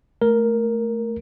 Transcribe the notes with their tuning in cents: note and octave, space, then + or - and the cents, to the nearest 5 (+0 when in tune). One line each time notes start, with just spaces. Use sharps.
A3 +0 A#4 +0